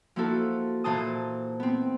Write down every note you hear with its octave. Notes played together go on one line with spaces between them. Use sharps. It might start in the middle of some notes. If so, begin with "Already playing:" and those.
F3 A#3 E4 F#4 A4
A#2 E3 C5 A5 D#6
B3 C4